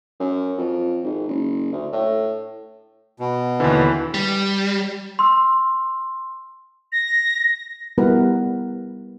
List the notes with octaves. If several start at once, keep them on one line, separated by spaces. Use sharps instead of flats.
F#2
F2
G#1
F#1
D2
A2
B2
D#2 D3 E3
G3
C6 E6
A#6
G3 B3 E4 F#4 A#4 B4